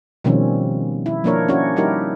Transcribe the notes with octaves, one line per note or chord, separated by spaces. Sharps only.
B2 D#3 F3 G3 C4 C#4
E4
F3 A#3 D4 A#4 C#5
C#4 D4 E4 F#4 C#5
G3 D#4 E4 G4 A#4